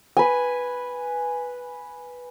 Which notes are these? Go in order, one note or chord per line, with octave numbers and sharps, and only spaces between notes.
B4 G#5